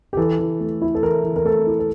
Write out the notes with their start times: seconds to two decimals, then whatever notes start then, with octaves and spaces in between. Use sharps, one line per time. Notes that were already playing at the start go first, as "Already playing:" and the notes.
0.13 G4
0.17 E3 A4
0.39 E3
0.60 A3
0.82 E4
0.95 A4
1.02 E3 A#4
1.24 E3
1.36 A#4
1.44 A3 A4
1.67 E4
1.79 A4